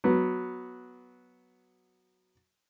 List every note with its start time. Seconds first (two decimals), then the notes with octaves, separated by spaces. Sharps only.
0.04 F#3 B3